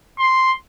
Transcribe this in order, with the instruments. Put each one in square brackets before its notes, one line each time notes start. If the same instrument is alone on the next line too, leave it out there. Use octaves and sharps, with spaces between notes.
[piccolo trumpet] C6